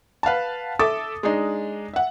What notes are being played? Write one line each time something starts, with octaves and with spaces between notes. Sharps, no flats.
B4 F5 F#5 A5
A4 E5 D6 D#6 A6
G#3 D4 D#4
E5 F#5